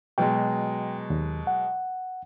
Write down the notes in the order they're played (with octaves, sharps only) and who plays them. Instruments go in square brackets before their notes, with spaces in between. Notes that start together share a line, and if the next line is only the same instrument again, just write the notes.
[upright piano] B2 F#3 G#3 [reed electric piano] G5
[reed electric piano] D#2
F#5